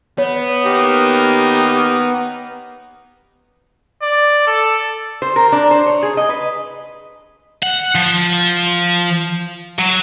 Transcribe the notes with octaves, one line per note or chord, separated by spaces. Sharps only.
B3 C#5
D#3 A#3 D#4 G4
D5
A4
C5
A#4
D4
C5
C#5
G#4
D#5
B4
F#5
F3
F#3